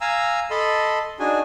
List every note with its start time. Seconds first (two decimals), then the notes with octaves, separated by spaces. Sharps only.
0.01 F5 G#5 A#5 E6
0.51 A4 D#5 A5 B5 C6
1.19 D4 D#4 F#4 G#4 G#5